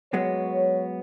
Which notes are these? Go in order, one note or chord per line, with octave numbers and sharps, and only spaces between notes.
F#3 G#3 B3 C#5